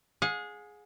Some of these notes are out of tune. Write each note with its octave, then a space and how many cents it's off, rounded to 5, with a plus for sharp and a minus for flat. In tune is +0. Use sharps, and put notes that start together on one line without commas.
G#4 +5 F#5 -45